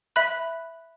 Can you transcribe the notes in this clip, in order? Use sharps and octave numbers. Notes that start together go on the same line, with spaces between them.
E5 B5 F#6